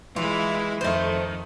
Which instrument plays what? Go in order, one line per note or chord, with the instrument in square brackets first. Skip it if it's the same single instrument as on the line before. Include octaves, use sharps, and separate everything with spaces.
[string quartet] E3 G#3 E4 [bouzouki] F4
[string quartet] F2 D#3 [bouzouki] A3 C5